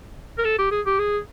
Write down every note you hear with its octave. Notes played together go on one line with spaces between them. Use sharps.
A#4
A4
G4
G#4
G4
G#4